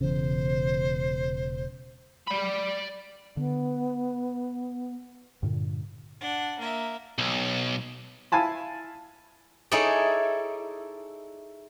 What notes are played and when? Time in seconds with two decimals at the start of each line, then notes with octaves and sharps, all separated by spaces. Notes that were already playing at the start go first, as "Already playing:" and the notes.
0.01 E1 E2 C#3 C5
2.28 D5 B5
3.37 D3 B3
5.43 G2 A#2 D3
6.21 D4 F#5
6.59 A#3 E5
7.19 B1
8.32 E4 F5 G#5 A5 B5
9.72 D#4 E4 G#4 A4 C#5 D5